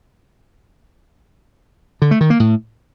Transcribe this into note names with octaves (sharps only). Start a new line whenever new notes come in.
D3
A3
D#3
A#3
A2